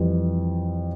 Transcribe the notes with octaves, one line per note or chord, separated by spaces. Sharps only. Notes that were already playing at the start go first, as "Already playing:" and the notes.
Already playing: F2 E3 G3